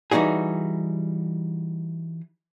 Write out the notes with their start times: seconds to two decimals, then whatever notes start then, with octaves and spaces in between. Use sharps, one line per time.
0.11 E3 G3 D#4 F#4 G#4